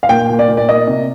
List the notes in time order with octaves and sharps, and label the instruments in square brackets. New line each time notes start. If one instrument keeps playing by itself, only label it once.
[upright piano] F5
A#2 G5
A#2
D5
A#2
D5
A#3 D#5
C3